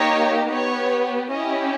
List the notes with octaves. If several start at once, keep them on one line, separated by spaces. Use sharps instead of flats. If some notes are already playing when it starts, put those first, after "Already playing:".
Already playing: A#3 D#4 G4 C#5
B3 G4 C#5
C#4 E4 G4 D#5